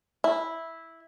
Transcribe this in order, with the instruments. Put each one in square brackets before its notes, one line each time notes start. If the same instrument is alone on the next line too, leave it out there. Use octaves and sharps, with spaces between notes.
[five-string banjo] E4